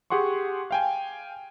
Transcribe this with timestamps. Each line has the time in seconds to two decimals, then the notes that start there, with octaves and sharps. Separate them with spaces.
0.10 G4 G#4 F#5 C6 C#6
0.71 F5 G5 G#5